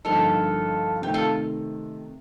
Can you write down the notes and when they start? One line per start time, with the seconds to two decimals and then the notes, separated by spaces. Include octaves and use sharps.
0.05 G2 D3 F3 A#3 D#4 F4 A4
1.02 C3 D#3 A3 G4
1.14 F4 A4